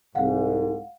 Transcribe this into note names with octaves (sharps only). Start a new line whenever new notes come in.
C2 G#2 F5 F#5